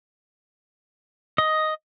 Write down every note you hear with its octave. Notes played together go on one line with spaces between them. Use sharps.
D#5